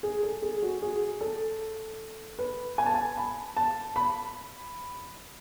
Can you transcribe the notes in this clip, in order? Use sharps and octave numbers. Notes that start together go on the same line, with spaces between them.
G#4
A4
G#4
F#4
G#4
A4
B4
G#5
A5
G#5
B5
A5
B5